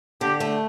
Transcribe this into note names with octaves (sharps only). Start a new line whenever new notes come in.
D3 G4
A3